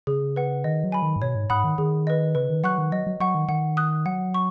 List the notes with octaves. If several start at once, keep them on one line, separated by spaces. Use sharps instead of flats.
C#3 G#4
B4 F#5
D#3 D#5
F#3
G#5 B5
D#3
G#2
B2 C#5
G#2
G#2 F#5 B5 D#6 F#6
D#3
D#3 G#4
B4 D#5
C#3 B4
D#3
F#3 F#5 C#6 F#6
D#3
F#3 D#5
F#3
F#3 F#5 C#6
D#3
D#3 F#5
D#6 F#6
F#3 F#5
C#6